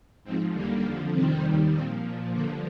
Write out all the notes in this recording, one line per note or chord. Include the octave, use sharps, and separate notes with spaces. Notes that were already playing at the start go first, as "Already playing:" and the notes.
G#2 F3 C4
D#2 D3 G3 A#3
F2 D3 F3
F2 C3 D#3 G3 C4
D#2 D#3 G3
A#2 F3 C4
A#2 F3
G2 D3 F3 A#3